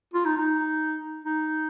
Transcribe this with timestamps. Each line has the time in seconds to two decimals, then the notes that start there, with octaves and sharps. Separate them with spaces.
0.14 F4
0.25 D#4
0.36 D#4
1.25 D#4